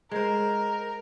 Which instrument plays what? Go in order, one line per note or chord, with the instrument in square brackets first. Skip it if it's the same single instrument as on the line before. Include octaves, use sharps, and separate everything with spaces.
[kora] G#3 C5 [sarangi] A#4